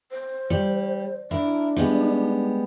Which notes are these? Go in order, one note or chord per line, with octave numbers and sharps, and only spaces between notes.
C5
G3
D4 E4 A#4
G3 G#3 B3